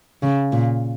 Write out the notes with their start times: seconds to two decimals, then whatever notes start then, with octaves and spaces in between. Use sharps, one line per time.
0.22 C#3
0.52 A#2